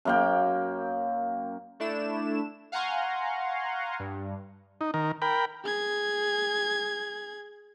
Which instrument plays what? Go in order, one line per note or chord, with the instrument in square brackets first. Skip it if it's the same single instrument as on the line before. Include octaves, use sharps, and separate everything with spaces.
[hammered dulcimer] F#2 A#3 G5
[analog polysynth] A3 D4 E4 E7
F5 F#5 G#5 A#5 C6 C#6
G2
[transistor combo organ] D#4
D#3 A#4
A#4 G5 B5
[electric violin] G#4 G#6